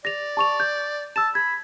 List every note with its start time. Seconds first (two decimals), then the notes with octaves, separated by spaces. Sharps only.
0.05 D5 A#6 F7
0.37 A5 C#6 F7
0.60 G6
1.16 A5 E6 E7
1.35 B5 G#6